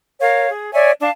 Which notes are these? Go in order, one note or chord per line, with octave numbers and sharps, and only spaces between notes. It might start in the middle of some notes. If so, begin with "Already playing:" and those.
A#4 C#5 F5
G#4
C#5 D5 E5 G#5
D4 F5 A5